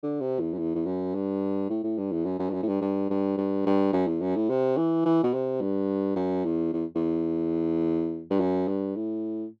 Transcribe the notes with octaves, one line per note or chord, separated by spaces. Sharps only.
D3
C3
E2
F#2
E2
E2
F#2
G2
A2
A2
G2
E2
F#2
F#2
G2
F#2
A2
G2
G2
G2
G2
G2
F#2
E2
F#2
A2
C3
E3
E3
B2
C3
G2
F#2
E2
E2
E2
G2
F#2
G2
A2